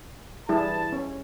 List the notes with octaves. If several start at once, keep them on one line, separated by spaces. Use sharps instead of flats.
E3 G3 E4 G#4 A5
C#4